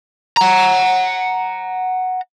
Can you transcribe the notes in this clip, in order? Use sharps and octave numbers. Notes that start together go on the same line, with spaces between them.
F#5 A#5